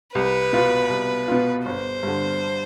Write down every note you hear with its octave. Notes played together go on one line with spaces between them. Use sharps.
C2 B4
B2 B3 F4
C2
B2 B3 F4
G1 C5
G2 D3